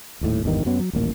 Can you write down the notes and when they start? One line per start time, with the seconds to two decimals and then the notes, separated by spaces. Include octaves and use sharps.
0.21 D#1 D#2 A2
0.44 G#1 E2 G2 D#3
0.65 F#2 F#3 B3 C#4
0.80 F#3
0.93 D#1 A1 A#3